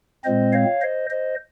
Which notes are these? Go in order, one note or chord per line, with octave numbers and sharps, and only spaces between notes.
A#2 G#3 C4 C5 D#5
C#5 F5
C5 D#5
C5 D#5